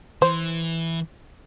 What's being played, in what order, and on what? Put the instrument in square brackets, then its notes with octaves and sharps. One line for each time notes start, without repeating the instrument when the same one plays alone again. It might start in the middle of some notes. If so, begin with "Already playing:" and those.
[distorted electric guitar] E3 [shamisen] C5